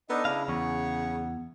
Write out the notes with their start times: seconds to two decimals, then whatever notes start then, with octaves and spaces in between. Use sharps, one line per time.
0.10 B3 D4 D#4 A4 D#5
0.25 C#3 D4 E4 F5
0.48 E2 B3 C#5 C#6